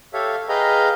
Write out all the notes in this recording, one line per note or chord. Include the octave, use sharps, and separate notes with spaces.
G4 A4 C#5 E5 F5
G#4 B4 D#5 F5 G5 A#5